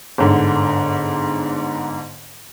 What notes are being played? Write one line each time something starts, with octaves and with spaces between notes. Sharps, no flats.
G1 G#2 D3